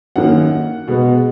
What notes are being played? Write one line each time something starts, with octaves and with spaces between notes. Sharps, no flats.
F#2 D#3 A#3 F#5
B2 G#3 B3